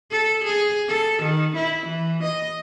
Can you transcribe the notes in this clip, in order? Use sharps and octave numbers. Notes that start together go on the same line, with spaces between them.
A4
G#4
A4
D#3
E4
E3
D#5